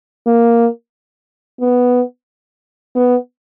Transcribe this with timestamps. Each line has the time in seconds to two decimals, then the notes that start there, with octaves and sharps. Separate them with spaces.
0.27 A#3
1.61 B3
2.96 B3